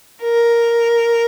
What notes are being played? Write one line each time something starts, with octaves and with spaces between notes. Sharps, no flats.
A#4